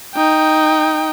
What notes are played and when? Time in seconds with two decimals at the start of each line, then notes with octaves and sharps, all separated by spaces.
0.15 D#4 G5